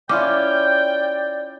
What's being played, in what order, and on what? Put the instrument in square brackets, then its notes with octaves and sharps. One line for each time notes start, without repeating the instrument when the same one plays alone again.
[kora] C#4 E4 F4 [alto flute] D5 [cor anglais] G5 [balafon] D6